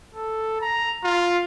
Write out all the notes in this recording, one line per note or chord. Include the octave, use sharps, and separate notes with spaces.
A4
A#5
F4